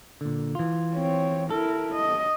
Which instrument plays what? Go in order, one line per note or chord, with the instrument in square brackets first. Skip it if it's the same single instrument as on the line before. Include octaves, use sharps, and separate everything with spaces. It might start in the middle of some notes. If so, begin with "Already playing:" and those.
[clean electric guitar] A#2 D3
E3 F4
[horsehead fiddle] C4 C#5
[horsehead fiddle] E4 A#4 [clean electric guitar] A4
[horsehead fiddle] D#5